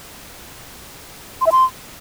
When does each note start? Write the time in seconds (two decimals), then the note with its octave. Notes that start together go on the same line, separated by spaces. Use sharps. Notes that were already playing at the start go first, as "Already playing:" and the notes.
1.41 C6
1.46 E5
1.52 C6